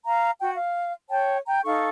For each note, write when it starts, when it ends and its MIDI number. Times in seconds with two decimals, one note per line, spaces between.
0.04 0.31 77
0.04 0.31 82
0.40 0.53 66
0.40 0.53 79
0.55 0.92 77
1.09 1.37 73
1.09 1.37 79
1.09 1.37 81
1.45 1.59 79
1.45 1.59 82
1.64 1.90 63
1.64 1.90 69
1.64 1.90 77
1.64 1.90 85